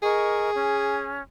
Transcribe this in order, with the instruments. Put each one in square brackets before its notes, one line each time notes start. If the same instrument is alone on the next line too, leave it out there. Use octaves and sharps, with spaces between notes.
[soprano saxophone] G#4 [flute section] A#4 D#5 C#6
[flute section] C#4